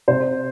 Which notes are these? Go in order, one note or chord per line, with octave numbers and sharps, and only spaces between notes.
C3 C5